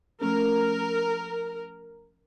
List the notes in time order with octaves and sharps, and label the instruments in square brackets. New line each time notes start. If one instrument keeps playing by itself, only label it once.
[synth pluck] F3 A3 C#4 [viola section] A#4